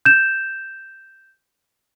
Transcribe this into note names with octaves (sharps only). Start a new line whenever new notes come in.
G6 E7